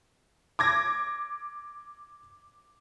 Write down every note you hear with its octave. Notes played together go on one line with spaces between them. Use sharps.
D6 G#6 A#6